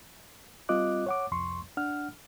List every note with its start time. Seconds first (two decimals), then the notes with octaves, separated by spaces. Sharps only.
0.69 G3 C4 F4 D#5 D6 F#6
1.06 C#5 F#5 D6
1.31 C2 F2 C6 C#6
1.77 D4 F#5 F6